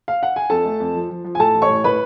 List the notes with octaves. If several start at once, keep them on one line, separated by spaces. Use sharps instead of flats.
F5
F#5
G#5
F2 A4 A5
A3
F2
F3
F3
F3
G#5
A2 A4 A5
A1
C#5 C#6
A2
A2 B4 B5